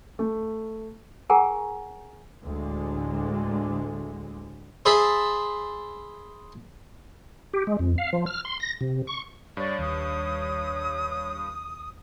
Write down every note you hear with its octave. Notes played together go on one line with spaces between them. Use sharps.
A3
G#4 A#4 F#5 G#5 A#5 C#6
D2 A2 D3 G#3
G#4 C5 E5 A5 B5
G4
G#3
F2
F5
F3
F6
C6
A#6
C3
C#6
G2 C#5 D5 C#6
D#2 D#6